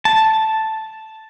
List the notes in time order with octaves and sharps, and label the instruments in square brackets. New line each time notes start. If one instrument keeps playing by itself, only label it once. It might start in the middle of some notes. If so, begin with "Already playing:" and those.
[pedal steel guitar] A5